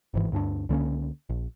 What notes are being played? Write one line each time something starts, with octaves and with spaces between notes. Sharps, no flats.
G1 G#2 E3
D2 G2 C#4 D4
C#2 D3 A#3 C#4
A#1